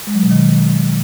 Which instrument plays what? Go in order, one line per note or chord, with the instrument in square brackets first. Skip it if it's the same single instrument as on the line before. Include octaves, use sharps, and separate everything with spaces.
[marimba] G#3
F#3
B2
D#3